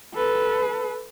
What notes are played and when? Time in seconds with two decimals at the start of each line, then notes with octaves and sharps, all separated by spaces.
0.14 A4 B4